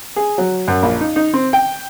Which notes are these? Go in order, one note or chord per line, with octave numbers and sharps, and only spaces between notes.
G#4
F#3
F#2
A#1
D#4
D#4
C4
G5